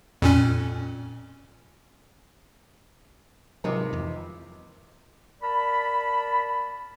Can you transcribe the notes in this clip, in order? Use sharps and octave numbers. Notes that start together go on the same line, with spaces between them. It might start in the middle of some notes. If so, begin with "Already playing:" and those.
F2 A#2 C#4
G#1 C3 F3 F#3 A#4 B4 D#5 D6
F2 E3
A#4 D5 A5 B5